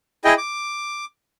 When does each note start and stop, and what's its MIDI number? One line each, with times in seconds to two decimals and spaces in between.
0.25 0.34 64
0.25 0.34 68
0.25 0.34 75
0.25 0.34 79
0.38 1.05 86